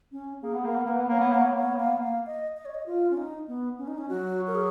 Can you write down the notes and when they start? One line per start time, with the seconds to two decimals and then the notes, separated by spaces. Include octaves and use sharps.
0.12 C#4
0.42 A#3 G#4
0.54 B3
0.65 A#3 A#4
0.76 B3
0.86 A#3 B4
0.97 B3
1.09 A#3 C#5
1.20 B3
1.31 A#3 C#5
1.42 B3
1.53 A#3 C#5
1.63 B3
1.76 A#3 F5
1.87 B3
1.98 A#3
2.03 F5
2.26 D#5
2.57 D#5
2.65 C#5
2.75 D#5
2.86 F4
3.11 C#4
3.17 D#4
3.48 B3
3.79 C#4
3.88 D#4
3.98 C#4
4.09 F#3 F#4
4.47 A#4
4.55 G#4